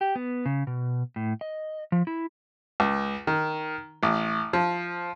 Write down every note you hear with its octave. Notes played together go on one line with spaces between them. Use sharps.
G4
B3
C#3
B2
A2
D#5
F3
E4
C#2
D#3
A1
F3